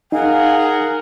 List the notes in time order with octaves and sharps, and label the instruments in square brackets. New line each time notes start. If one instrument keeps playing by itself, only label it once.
[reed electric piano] D#4 [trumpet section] G#4 A#4 F#5 [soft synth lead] F5 [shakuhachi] G#5